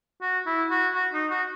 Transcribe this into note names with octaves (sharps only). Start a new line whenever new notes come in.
F#4
E4
F#4
F#4
D#4
F#4